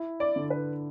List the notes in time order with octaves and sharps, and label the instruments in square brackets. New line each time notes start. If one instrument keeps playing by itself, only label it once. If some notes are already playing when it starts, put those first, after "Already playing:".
Already playing: [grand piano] E4
[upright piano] D5
[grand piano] D3
[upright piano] B4